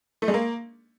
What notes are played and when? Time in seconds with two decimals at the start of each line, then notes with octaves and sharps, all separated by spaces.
0.22 A3
0.28 G#3
0.34 A#3